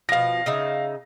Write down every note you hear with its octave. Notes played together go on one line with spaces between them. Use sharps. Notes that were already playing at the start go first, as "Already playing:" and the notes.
B2 F3 F5 A#6
C#3 D#4 E5